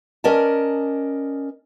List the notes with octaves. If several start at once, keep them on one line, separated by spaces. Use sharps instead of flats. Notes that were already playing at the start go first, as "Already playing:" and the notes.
C#4 A#4 D5 D#5 A5